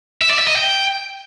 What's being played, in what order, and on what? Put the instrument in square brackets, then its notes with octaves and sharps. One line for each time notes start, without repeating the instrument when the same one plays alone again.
[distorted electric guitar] E5
D5
E5
D#5
G5